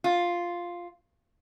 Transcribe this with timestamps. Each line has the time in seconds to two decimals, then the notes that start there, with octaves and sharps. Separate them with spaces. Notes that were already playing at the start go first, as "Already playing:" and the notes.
0.04 F4